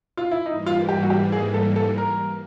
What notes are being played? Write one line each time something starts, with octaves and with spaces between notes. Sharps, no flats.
F4
E4
G#2 E3 G3 A#3 D#4
F4
G4
F#4
G4
G#4
A4
A4
A#4